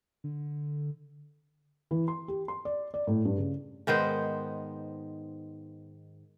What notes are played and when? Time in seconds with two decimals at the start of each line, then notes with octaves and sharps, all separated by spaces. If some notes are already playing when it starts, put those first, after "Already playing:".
0.24 D3
1.91 E3
2.08 C6
2.28 G4
2.48 C6
2.65 D5
2.94 D5
3.07 A2
3.25 G2
3.37 C#3
3.87 G#2 D#3 B3 C5